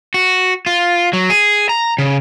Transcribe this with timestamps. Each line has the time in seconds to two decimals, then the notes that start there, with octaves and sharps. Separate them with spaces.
0.14 F#4
0.66 F4
1.13 F#3
1.30 G#4
1.69 A#5
1.98 C#3